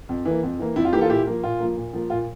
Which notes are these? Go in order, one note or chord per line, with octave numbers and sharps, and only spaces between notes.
F2
E3 A#3
F2
E3 A#3
F2 E4
F4
E3 A#3 E4 G4
F4 A4
A#2 E4 G4
F3 A#3
A#2 F4
F3 A#3
A#2
F3 A#3
A#2 F4